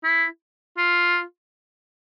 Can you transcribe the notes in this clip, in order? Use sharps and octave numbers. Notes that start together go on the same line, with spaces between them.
E4
F4